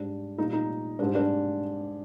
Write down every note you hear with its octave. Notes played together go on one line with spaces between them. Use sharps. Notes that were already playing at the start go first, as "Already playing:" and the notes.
Already playing: G#2 G3 D4
A#2 G3 D#4
D#4
G#2 G3 D4
D4